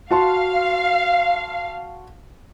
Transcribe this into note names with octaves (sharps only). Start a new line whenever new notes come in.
F#4 F5 A5 C6